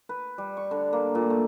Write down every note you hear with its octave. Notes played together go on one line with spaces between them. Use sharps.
B4
G3
C#6
D3
A#3
A#2
A3